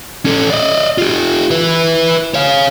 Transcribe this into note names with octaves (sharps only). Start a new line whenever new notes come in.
C#4 A4
D5 D#5
F4 G4
E4 B4
C#5 F5